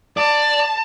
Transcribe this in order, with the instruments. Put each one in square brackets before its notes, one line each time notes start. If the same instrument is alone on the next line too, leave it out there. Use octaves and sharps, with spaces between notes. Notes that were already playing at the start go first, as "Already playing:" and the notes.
[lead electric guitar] D5 [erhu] A5